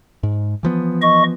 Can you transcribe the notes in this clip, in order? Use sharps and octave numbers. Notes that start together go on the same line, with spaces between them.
G#2
E3 F3 B3
D#5 C#6